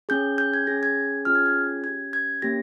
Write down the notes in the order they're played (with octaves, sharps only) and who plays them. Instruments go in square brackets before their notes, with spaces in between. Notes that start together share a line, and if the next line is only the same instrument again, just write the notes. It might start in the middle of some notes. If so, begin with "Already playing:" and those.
[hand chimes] C#4 G#4 G6
G6
G#6
C#4 G#4 A#6
G#6
C#4 F4 G#4 F6
G#6
G#6
C#4 G4 G#6
G#6
A#3 C#4 G4 A#6